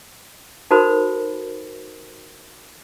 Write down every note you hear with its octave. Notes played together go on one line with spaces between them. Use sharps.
D#4 F#4 A4 A#4 C5 B5